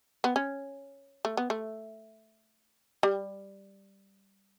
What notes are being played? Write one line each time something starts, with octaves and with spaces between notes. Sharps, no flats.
B3
C#4
A3
B3
A3
G3